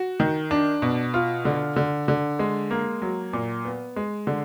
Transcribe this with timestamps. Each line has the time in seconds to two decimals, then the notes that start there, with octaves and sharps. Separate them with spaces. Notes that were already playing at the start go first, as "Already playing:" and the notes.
Already playing: F#4
0.20 D#3
0.51 D4
0.82 B2
1.14 F4
1.45 D3
1.76 D3
2.08 D3
2.39 G#3
2.71 A#3
3.02 F#3
3.33 A#2
3.65 B3
3.96 G#3
4.27 D3